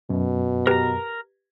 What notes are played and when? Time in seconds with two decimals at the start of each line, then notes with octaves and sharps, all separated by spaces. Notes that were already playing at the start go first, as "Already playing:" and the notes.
0.10 F#2 B2
0.67 G4 A#4 B4 A#5